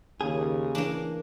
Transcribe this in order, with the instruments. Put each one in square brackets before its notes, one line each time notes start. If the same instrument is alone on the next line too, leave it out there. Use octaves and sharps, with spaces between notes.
[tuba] D#2 [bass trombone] C#3 [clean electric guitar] G#4
[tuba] E3 [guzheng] A#3 D4